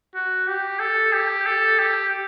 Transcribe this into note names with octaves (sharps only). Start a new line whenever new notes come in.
F#4
G4
A4
G4
A4
G4